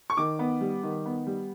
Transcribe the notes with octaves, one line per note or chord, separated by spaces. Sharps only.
C#6
D#3 D6
B3
G3
D#3
B3
G3